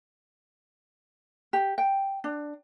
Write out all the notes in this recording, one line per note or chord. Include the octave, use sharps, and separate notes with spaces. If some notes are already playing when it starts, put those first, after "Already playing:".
G4
G5
D4